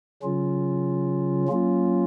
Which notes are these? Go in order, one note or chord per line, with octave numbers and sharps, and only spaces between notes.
C#3 F#3 C#4 F4
F#3 A#3 C#4 F4